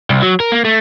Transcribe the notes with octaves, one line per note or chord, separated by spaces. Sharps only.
C2
F#3
A#4
A#3
A3